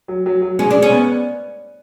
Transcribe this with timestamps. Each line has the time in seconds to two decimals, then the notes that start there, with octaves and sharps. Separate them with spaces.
0.08 F#3
0.26 F#3
0.42 F#3
0.59 G#3 C#4
0.71 D4
0.76 G#3
0.82 C#4
0.91 B3